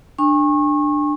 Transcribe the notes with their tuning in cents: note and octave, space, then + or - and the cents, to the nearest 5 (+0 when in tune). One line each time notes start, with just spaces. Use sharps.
D4 +15 G#5 -40 C#6 -30